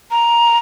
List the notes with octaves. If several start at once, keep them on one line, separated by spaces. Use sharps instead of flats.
A#5